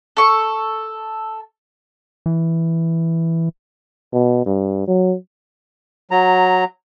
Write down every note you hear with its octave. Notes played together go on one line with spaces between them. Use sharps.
A4 C#6
E3
B2
G2
F#3
F#3 A#5